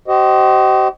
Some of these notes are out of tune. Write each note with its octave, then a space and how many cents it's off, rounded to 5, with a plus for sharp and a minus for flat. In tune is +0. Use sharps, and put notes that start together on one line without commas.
G4 -45 C5 +0 D#5 +0